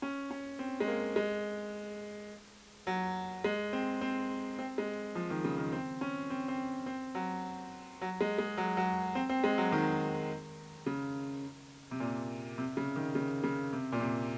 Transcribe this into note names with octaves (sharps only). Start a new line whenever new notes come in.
C#4
C#4
C4
G#3
A#3
G#3
F#3
G#3
C4
C4
C4
G#3
F3
D#3
C#3
D#3
C4
C#4
C4
C4
C4
F#3
F#3
G#3
G#3
F#3
F#3
C4
C4
G#3
F#3
D#3
C#3
C3
A#2
C3
C#3
D#3
C#3
C#3
C3
A#2
C3